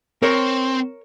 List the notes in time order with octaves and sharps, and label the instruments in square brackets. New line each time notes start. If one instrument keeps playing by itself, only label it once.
[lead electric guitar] C4 [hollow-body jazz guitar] A#4 C#5